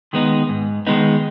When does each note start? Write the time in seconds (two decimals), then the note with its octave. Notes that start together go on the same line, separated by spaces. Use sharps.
0.13 D#3 G#3 B3 D#4
0.49 G#2
0.87 D#3 G#3 B3 D#4